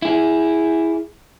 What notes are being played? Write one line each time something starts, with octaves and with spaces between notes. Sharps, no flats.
E4 G#4